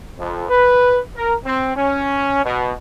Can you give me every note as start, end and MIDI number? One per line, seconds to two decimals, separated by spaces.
0.18 0.48 41
0.49 0.98 71
1.16 1.34 70
1.45 1.72 60
1.76 2.43 61
2.45 2.72 47